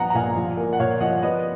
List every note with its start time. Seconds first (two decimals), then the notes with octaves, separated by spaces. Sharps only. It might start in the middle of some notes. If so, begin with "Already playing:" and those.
Already playing: A#1 B3 F#5 A#5
0.10 A#5
0.14 A#2 F5 G#5
0.36 F3
0.57 A#3
0.73 F#5
0.79 A#2 C#5 F5
1.00 F3 D#5 F#5
1.22 B3 B4 D#5